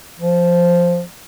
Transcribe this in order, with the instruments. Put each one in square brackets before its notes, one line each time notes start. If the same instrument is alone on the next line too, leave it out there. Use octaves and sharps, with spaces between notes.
[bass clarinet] F3